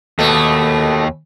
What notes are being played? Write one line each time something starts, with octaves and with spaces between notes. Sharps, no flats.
D#2 B2 A3